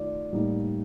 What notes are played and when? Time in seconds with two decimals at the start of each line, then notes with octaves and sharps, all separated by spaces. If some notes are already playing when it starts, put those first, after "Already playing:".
Already playing: D#3 A3 F4 D5
0.32 A2 G3 A#3 D#4